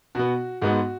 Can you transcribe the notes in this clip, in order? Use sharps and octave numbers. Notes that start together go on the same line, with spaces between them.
B2 B3 F#4
G#2 G#3 B3 F#4